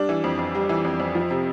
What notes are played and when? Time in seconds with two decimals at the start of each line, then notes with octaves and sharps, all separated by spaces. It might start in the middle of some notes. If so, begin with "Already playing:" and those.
Already playing: G3 D4
0.09 E3
0.24 F2
0.39 F2
0.55 G3
0.69 E3
0.85 F2
1.00 F2
1.15 F3
1.31 C3